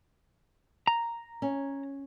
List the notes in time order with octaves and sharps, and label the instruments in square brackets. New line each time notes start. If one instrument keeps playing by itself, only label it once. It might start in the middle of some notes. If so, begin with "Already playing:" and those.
[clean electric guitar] A#5
[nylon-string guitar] C#4